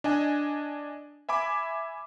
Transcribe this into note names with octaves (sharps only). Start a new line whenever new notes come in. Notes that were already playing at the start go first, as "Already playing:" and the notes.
D4 D#5 G#5
E5 G#5 B5 D6